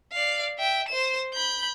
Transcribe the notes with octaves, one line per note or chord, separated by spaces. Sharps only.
D5 F5
E5 G5
C5 E7
B5 G6